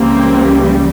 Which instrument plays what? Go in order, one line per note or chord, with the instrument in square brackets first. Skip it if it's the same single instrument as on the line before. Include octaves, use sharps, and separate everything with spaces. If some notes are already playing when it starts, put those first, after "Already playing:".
Already playing: [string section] C#2 C#3 E3 G3 A#3 C4